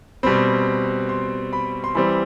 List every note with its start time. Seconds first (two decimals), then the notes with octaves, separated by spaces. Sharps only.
0.23 B2 G3 C4 B5
1.09 C6
1.53 B5
1.84 C6
1.95 E3 G3 C4 B5